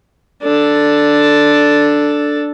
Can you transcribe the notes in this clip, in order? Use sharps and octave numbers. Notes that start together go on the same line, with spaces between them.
D4 A4